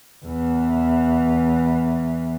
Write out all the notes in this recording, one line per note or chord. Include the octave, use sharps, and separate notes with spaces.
E2 E3